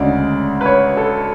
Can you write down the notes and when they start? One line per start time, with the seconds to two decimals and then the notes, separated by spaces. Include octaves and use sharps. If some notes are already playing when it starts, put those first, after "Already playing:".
Already playing: D2 C#3 G#3 D5
0.61 B4
0.66 C#5
0.97 A4